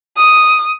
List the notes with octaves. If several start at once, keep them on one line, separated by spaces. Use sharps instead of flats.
D#6